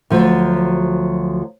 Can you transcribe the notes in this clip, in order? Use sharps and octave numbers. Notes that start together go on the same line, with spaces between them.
D2 F3 F#3